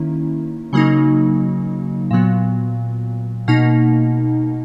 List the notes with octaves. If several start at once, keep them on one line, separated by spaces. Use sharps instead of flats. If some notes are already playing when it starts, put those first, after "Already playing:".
Already playing: D#3 A#3 C#4 E4
C#3 F#3 A#3 D#4
A#2 F#3 B3
B2 A#3 D#4